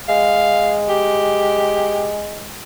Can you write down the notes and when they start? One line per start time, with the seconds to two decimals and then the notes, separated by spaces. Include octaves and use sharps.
0.09 G#3 F5
0.89 G4